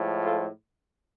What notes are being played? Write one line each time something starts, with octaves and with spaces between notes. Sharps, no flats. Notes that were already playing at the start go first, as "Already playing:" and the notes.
Already playing: A2 F3 G#3
F4 A4